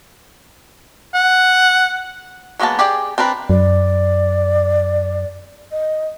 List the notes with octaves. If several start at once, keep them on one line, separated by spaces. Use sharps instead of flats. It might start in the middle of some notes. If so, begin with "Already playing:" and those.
F#5
F#3 G#3 A#3 B3 A5
G4 G#4 D5 G5
C4 D4 A#4 B4
F#2 D5
D#5